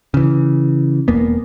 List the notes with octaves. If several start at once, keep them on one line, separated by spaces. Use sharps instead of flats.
C#3 E3
E1 E2 A#3 B3